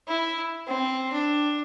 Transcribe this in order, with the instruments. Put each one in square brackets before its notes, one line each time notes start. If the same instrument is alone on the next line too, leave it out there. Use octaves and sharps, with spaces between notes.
[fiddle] E4
C4
D4